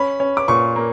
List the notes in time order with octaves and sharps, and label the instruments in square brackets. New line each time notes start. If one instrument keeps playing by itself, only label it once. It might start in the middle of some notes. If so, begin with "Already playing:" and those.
Already playing: [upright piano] C#4 B5
C#4
D6
A#2 C#6
A#3